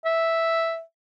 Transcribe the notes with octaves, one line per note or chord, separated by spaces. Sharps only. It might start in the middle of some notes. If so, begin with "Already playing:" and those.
E5